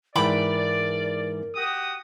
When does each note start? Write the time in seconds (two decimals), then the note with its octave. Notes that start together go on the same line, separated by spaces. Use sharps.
0.15 G#2 E3 A#4 D5 G5 B5 D6
1.55 F#4 G4 D#6